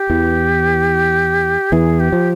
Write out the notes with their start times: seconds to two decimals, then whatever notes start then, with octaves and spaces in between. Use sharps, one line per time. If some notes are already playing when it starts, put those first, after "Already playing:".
Already playing: G4
0.10 E2 E3
1.72 E2 E3 G#4
2.00 G4
2.12 F3